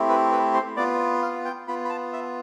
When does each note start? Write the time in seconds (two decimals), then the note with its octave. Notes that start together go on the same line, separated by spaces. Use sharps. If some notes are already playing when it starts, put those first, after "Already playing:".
Already playing: A3 C4 E4 G4
0.09 B4
0.32 B4
0.54 C5
0.77 B3 F4 D5
1.22 F5
1.45 G5
1.68 B3 F4 B5
1.85 B5
1.90 A5
2.13 E5